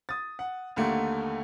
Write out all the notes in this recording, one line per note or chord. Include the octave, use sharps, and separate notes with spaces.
D#6 A6
F#5
D#2 D3 A3 A#3